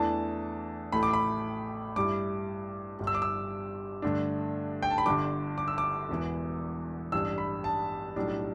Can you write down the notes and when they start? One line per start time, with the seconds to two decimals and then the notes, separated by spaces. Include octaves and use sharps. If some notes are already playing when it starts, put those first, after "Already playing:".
Already playing: E2 E3 A3 D4 A5
0.92 A1 A2 A3 B5
1.03 D6
1.13 B5
1.96 G2 G3 E4 D6
2.99 G1 G2 G3
3.07 E6
3.14 D6
3.22 E6
4.02 G2 D3 A3 D4
4.83 G5
4.90 A5
4.98 B5
5.06 G1 G2 D3 D6
5.58 D6
5.68 E6
5.78 D6
6.09 E1 E2 E3 B3
7.12 A1 G2 G3 D4 E6
7.38 B5
7.64 A5
8.16 B1 A2 G3 D4